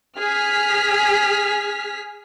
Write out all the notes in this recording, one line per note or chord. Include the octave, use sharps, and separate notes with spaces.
G#4 F6 B6